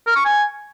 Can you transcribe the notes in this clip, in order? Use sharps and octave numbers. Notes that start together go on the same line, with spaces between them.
A#4
C#6
G#5